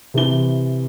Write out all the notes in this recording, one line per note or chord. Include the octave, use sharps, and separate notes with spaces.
C3 E3 G7